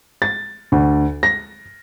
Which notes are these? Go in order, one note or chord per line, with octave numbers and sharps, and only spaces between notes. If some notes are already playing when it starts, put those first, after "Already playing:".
A6
D2
A#6